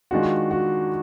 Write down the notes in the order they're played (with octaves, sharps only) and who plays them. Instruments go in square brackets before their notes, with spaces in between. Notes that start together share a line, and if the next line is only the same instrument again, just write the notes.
[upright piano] D#3 G#3 D4 F4 [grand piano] F#4
[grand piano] F#4